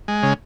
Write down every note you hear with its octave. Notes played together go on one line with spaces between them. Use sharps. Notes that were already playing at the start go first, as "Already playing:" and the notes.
G#3
C#3